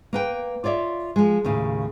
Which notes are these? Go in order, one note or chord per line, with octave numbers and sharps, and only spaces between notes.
A#3 B4 G5
F4 C#5 D5 E5
F3 G#3
D#2 A2 C#3